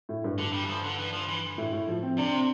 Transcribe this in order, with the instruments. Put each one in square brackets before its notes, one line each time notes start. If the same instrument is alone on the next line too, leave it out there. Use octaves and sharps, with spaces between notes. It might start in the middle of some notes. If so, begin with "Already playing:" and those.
[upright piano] A2
G2
[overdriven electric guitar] D3
G3
E3
F3
D3
E3
F3
E3
[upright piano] A2
A2
F3
C4
[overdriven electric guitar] C3 [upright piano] D4
[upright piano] C4